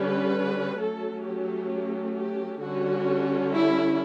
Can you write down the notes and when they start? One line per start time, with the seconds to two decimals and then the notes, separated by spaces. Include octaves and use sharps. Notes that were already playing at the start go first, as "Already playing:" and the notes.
Already playing: D3 G3 C#4 B4
0.81 F#3 A3 C#4 A4
1.27 G4
2.17 G4
2.62 D3 G3 C#4 F#4
3.53 E4